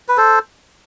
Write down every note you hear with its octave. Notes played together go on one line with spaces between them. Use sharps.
B4
A4 C5